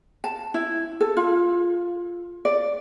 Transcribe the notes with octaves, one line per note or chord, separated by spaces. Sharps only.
A5
E4
A4
F4
D5